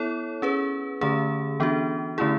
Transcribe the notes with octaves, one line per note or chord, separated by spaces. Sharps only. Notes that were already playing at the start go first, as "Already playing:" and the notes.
Already playing: B3 E4 A4 C#5
C#4 G#4 B4
D3 A3 C#4 G#4
E3 B3 D4 F#4
D3 A3 C#4 E4 G#4